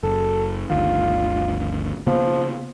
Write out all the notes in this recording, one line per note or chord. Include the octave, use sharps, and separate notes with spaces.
F#1 A4
G1 D2 D#3 F4
C#3 F3 A#3 B3